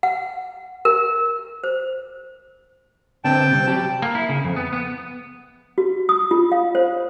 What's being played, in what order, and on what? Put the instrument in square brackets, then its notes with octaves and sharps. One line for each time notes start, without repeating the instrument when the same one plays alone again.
[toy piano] F#5
A#4
C5
[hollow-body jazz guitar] D3 B3 C4 [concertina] G5 A5
[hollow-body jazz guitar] C3 G3 C4
F#3 G4
[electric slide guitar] A#3
E4
C#3
F2
B3
B3
[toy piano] F#4
D#6
F4
F5
C5